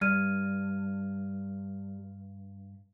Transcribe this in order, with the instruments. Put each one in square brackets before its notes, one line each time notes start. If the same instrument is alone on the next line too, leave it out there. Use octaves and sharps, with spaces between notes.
[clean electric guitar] G2 [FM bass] G3 [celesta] F6 G#6 D#7